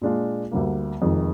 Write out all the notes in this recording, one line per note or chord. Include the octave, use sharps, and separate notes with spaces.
A#2 G#3 D4 F4
D2 D3 G3 A#3
F1 F2 D#3 G#3